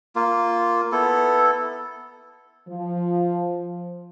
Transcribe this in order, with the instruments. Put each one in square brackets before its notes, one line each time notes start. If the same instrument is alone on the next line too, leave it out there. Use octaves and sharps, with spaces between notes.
[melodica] A#3 F4
B3 E4 A4
[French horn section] F3